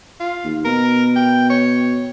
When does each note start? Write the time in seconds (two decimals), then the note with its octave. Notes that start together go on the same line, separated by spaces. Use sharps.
0.20 F4
0.44 D#2
0.65 B2 A#4
1.16 G5
1.50 C#5